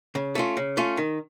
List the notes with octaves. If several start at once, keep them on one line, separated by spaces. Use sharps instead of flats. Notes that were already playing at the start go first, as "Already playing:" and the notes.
C#3
A3 C#4 F4
C#3
A3 C#4 F4
D#3